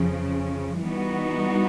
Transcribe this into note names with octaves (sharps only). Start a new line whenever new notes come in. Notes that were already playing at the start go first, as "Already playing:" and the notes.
Already playing: F2 C#3 F3
E3 G3 B3 D#4 F#4